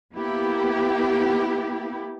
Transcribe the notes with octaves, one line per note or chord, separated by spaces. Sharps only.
A#3 B3 E4 G4